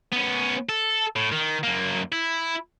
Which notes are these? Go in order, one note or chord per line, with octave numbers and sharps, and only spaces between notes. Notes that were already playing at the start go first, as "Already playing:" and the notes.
B3 C#4
A4
A2
D#3
F#2 A#3
E4